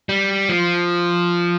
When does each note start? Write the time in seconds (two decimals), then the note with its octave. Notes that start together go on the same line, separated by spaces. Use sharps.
0.09 G3
0.49 F3